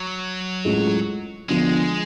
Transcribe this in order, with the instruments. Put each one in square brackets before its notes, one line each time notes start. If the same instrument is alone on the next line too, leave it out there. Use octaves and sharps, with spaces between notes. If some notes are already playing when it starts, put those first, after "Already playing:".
Already playing: [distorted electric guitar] F#3
[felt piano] A2 G#3 C#4 F4
[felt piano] D3 F3 B3 D4 [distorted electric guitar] G#3